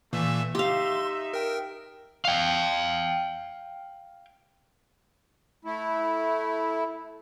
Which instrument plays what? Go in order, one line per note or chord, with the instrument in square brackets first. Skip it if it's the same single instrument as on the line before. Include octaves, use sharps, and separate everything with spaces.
[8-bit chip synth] A#2 E3 A#3 [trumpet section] A3 E5
[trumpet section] D#4 E5 [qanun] G4 F5 [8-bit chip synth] C6
[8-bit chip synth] A#4 G5
[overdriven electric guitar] F5 G5
[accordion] A3 E4